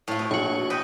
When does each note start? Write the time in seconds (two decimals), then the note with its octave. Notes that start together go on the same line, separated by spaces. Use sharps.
0.08 A2 F4
0.19 B2
0.31 A#1 F#4 C#5
0.70 B4 D#5 G5